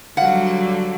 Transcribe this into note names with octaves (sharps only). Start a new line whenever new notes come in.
D3 F#3 G3 F5 F#5